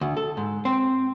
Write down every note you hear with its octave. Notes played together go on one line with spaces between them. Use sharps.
D2
A4
G#2
C4